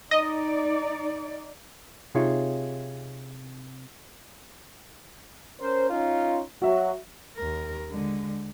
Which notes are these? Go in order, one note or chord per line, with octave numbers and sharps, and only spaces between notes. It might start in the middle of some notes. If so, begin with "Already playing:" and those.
D#4 D5 D#5
C3 D#4 F4 G#4 C#5 E5
C#4 A#4 C5
C#4 D#4 F4
F#3 F#4 E5
D#2 A#4
D3 G#3